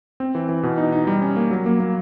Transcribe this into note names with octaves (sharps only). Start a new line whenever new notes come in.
C4
E3
E3
B2
D#4
D#4
G3
C#4
A#3
F#3
A#3
A#3